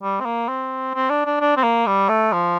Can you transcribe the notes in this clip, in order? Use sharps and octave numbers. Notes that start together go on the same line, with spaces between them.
G3
C4
A#3
C4
C4
D4
D4
D4
C4
A#3
G3
A3
F3